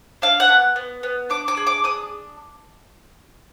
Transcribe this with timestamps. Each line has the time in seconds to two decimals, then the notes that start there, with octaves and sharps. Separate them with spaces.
0.22 D4 F5
0.40 F#5
0.49 B3
0.76 B3
1.03 B3
1.30 D4 D6
1.48 D6
1.57 G#4
1.67 D6
1.84 D4 D#6